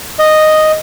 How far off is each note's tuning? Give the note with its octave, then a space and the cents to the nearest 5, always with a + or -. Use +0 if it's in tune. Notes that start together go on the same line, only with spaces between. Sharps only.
D#5 -5